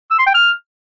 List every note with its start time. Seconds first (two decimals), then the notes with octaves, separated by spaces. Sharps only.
0.11 E6
0.19 C6
0.26 G5
0.34 F6